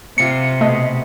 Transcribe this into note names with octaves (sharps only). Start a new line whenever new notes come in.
C3 F4 C#7
B2 A3 D#5